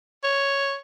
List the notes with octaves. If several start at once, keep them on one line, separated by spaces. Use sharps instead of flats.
C#5